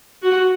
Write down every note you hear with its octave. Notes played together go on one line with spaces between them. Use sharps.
F#4